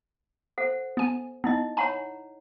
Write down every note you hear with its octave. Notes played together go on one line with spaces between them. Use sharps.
A4 C5 F#5
B3 G#5
B3 D#4 E4 D#5
C#5 F#5 G#5 A#5 B5 C#6